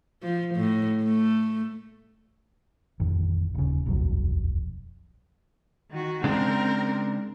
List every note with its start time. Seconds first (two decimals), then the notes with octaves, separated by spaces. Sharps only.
0.23 F3
0.55 A2
1.02 A3
3.00 A1 F2 D#3
3.54 D#1 C#3
3.86 D#1 B1 F2 F#3
5.90 D#3 F#4
6.24 C#3 G#3 C4 D4 A#4